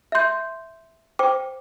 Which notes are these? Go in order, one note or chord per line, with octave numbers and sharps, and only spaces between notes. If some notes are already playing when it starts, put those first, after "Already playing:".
E5 C6 G6
C5 G5 D6